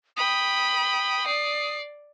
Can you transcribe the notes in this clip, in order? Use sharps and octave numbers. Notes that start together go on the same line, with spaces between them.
G5 B5 D#6
D5 C7